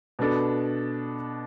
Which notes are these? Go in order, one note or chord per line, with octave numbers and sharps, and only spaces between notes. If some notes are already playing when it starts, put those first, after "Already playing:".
B2 B3 D4 A4